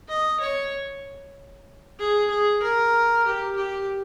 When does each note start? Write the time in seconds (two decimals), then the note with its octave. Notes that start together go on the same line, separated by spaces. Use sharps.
0.09 D#5
0.40 C#5
1.99 G#4
2.30 G#4
2.62 A#4
3.26 G4
3.56 G4